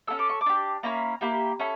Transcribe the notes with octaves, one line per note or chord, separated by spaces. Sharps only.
C#4 E4 A4 E6
D6
C#6
D6
D4 G4
A#3 C#4 E4 A#5
A#3 E4 G4
C#4 E4 A4